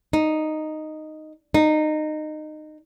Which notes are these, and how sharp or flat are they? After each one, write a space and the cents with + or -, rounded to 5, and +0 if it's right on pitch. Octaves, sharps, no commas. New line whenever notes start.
D#4 -5
D#4 -20